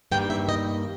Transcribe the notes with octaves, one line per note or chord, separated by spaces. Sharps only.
G2 D#3 A#3 G5
E5
D#5